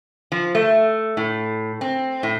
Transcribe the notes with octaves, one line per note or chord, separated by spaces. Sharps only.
F3
A3
A2
C4
A2